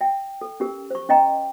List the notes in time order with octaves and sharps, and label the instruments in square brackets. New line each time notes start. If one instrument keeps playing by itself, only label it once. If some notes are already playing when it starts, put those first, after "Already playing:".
[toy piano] E5 G5
A4
C#4 G4 A#4
C5 C#6
C#4 D#5 G5 A#5